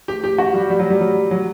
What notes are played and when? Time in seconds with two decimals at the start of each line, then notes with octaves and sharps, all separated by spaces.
0.08 G4
0.24 G4
0.38 F#4
0.54 G3
0.70 G3
0.79 F#3
0.90 G3
1.01 F#3
1.31 F#3